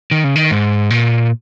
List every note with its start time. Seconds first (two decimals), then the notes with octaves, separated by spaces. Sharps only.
0.11 D#3
0.24 C#3
0.36 D#3
0.51 G#2
0.90 A#2